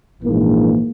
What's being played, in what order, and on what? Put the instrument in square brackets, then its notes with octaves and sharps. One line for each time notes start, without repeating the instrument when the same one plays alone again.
[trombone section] A#1 G#2 E3 A#3